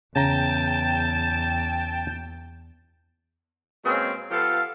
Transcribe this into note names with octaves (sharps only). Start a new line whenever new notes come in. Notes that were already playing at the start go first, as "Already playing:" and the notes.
E2 C#3 G5 A5 A#5
B2 G#3 A#3 C4 C#4
F3 B3 F4 G4 A4 F5